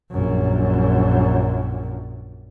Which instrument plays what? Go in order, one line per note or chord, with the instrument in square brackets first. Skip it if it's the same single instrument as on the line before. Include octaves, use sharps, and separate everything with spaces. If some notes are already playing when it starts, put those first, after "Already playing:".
[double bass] A#1 F#2